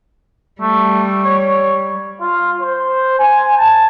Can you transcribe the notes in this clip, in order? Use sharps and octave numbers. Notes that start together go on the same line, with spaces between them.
G3 A3
C#5
F4
C5
G#5
A5